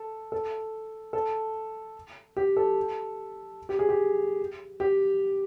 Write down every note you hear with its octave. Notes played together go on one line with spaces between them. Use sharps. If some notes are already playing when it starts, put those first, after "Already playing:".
Already playing: A4
A4
A4
G4
A4
G4
G#4
G4
G4